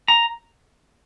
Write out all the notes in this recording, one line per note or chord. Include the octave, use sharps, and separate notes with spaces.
A#5